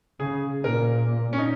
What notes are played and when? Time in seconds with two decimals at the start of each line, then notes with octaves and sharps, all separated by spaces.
0.20 C#3 G#4
0.64 A#2 A#4
1.33 C#4
1.38 D#4